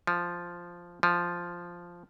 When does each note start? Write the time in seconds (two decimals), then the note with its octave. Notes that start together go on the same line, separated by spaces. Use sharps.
0.07 F3
1.03 F3